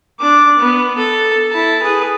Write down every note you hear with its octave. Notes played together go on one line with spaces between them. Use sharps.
D4 D6
B3
A4
E4 A5
G#4 B4